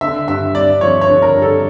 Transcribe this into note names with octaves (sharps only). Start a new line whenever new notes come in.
D3 E5
G2 E5
G2 D5
F3 C#5
C#5
D3
A#4
G2
A4